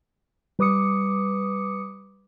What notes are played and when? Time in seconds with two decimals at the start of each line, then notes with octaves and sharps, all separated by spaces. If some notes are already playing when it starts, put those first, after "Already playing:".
0.59 G3 B4 D6 D#6 C#7